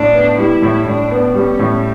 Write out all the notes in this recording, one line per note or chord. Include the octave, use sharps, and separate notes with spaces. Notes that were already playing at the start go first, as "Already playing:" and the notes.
Already playing: A2 D4
B3
G3 E4
A2
A2 D4
B3
G3 C#4
A2